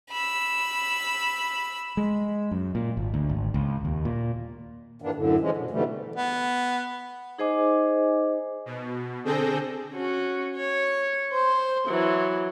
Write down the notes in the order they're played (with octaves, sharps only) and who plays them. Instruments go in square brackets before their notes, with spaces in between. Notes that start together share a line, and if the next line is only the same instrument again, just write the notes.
[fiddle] B5 E6
[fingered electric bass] G#3
F#2
A#2
G#1
D2
G#1
C#2
D#2
A#2
[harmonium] G2 D#3 E3 A#3 B3 D4
F#2 A2 D3
E3 F3 G#3 C#4
B2
G#2 B2 D3 E3 G3 A3
[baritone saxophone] B3
[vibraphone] D#4 G#4 C5 D#5 G#5 D6
[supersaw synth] B2
D3 C4 G#4 A4 G6 A#6
[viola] C#4 F#4
C#5
C5
E3 F#3